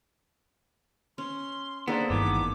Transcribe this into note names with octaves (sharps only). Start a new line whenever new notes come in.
C#4 C6
A#3 B3 D4 G#4 A4 C5
G1 G2 D#3 E3 B3 D6